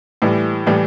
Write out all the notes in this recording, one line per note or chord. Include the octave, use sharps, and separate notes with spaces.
A2 E3 G3
A2 E3 G3